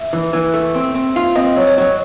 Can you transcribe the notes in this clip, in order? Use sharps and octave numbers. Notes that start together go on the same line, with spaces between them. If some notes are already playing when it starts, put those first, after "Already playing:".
Already playing: E5
E3
E3
A3
C4
C4
F4
C4 D#5
F#3
C#5
F#3